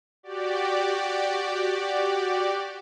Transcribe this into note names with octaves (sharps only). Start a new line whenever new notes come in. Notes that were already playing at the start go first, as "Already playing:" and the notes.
F#4 G4 D5